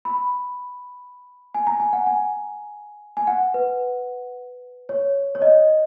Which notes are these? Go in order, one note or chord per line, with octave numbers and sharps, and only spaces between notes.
B5
G#5
A#5
G#5
F#5
G#5
G#5
F#5
B4
C#5
C#5
D#5